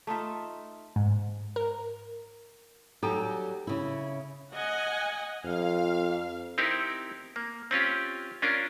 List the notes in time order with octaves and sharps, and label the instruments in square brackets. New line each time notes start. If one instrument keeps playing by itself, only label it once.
[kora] A3 D#4 F4 E5
[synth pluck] G#2
A#4
[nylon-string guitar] F#3 G3 G4 [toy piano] D#4 A4 A#5
[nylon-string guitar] C#3 E4
[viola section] D#5 F#5 G#5
[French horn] F2 [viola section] F5
[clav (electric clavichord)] C4 D#4 E4 G4 A#4
A#3
C4 C#4 F4 G4
C#4 D4 F4 A#4